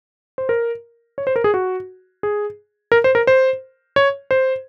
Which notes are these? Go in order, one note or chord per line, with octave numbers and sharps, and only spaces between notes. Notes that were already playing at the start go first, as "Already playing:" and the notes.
C5
A#4
C#5
C5
A#4
G#4
F#4
G#4
A#4
C5
A#4
C5
C#5
C5